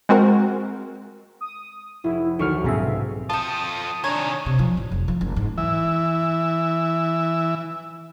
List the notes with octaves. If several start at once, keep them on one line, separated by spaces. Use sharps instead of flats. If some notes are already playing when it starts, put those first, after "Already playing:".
G#3 C4 F#4 A#4
D#6
F1 E4
D2 D#3 F#3 C#6 F6
B1 G#2 C3 A#3 C4 G#4 E5
B2
F4 A4 G5 A5 D#6
C3 D#3 D4 C#5 G#5 A#5
C3
F3
A1
F1
F3
F#1
G#2
E3 E5